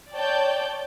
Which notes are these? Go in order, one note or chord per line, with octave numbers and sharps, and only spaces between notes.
C#5 D5 G5 A5 G6